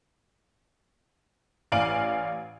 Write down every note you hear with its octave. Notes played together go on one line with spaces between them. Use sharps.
A1 D5 F5 G#5 D7 F#7